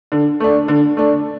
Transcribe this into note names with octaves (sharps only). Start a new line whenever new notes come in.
D3
A3 D4
D3
A3 D4